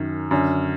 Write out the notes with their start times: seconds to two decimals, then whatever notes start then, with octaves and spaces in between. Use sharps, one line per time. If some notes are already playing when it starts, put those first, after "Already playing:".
Already playing: F#2 D#3
0.31 F#2 D3